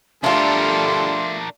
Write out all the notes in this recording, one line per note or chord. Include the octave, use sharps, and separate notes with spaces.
D3 G3 A3 D4 F4 A4 A#4 C6